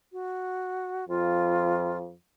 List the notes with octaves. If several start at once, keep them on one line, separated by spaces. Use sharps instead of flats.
F#4
F2 F4